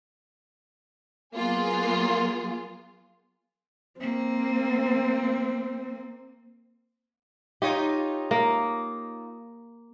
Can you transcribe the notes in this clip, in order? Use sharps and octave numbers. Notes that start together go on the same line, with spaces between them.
F#3 A#3 B3 F4 G#4
A#3 C4
D#4 F4 G4 C#5
A#3